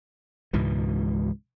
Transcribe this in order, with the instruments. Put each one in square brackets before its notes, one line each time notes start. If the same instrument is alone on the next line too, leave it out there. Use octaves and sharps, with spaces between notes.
[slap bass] C#2 G#2 B2 E3